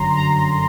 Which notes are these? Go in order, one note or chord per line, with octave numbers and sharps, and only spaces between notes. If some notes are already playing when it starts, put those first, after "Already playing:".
Already playing: G1 F#2 D3 F#3 A#5 C6
A#5